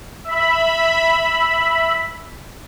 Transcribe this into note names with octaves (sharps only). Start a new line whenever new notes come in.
E5 B5